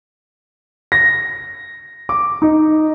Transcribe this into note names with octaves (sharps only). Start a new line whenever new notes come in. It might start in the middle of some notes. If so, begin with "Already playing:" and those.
A#6
D6
D#4